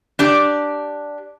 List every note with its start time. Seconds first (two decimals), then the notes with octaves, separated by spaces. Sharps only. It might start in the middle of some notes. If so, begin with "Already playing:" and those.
0.19 D4 G4 D5